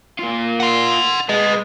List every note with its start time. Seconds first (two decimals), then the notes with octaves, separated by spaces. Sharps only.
0.19 A#3 F4
0.60 F#5 C6
1.29 G#3 B4 D#5